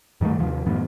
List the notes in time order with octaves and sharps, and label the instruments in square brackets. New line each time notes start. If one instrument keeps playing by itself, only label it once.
[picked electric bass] G2 D#3 G3 A3
D#2 C3 F3
F#2 A2 D#3 B3